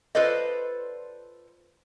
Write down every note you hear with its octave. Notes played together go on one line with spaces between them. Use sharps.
F4 A4 B4 C5 D5 D#5